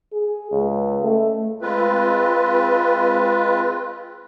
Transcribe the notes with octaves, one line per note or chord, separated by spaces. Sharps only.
G#4
C#2
A3
G#3 C4 F4 B4